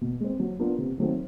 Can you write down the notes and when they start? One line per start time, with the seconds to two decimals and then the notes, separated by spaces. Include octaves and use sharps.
0.01 B2
0.20 G#3 C4
0.40 F#3
0.59 B3 D4 F4 A#4
0.78 C3
0.98 D#3 F#3 A3 C4